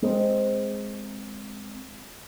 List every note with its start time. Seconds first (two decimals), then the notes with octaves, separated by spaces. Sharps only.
0.02 G#3 A#3 C4